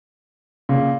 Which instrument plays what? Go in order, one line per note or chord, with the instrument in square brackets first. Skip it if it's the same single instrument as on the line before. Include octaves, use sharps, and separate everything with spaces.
[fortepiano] A#2 [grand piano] C#3